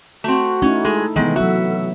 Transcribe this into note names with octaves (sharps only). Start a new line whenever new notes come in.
A3 C4 F#4
A3 C#4 D#4 E4
G#3 G#4 A4
C3 D#3 E3 G#3 B3 F#5
F#3 F#4 A4 E5